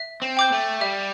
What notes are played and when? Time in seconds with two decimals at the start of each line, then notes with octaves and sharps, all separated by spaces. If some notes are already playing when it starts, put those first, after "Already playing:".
Already playing: E5
0.22 C4
0.37 G5 D6 G6
0.52 A3
0.81 G3 E5